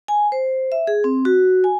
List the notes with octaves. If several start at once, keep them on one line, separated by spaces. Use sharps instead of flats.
G#5
C5
E5
G#4
C4
F#4
G#5